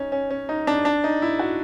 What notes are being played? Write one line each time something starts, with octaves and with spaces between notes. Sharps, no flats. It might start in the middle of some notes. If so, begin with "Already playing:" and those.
Already playing: C#4 D#4
C#4
C#4
D#4
D4
D4
D#4
E4
F#4